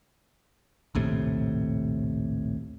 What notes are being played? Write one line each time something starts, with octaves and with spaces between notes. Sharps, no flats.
A#1 D#2 A2 C3